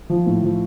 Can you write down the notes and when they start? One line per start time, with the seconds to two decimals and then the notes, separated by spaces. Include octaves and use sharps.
0.10 F3
0.26 A2
0.43 F3